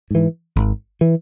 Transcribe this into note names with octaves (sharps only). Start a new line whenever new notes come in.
G#2 E3
G#1
E3